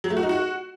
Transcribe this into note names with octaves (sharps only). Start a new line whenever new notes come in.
F#3
A3
F#4
D#4
F#4